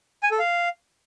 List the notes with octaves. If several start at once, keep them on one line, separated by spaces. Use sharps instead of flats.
G#5
A4
F5